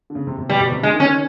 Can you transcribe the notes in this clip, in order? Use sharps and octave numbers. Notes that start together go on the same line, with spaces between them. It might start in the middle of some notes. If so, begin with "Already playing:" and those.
D3
C#3
C3
C3
B2 G3
B2
C3
D3 G#3
D#3
C#4
D#3